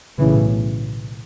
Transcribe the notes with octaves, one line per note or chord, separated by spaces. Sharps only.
B1 A2 C#3 E3